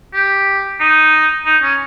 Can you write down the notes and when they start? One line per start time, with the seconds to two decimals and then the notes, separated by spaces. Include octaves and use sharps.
0.14 G4
0.80 D#4
1.46 D#4
1.63 C#4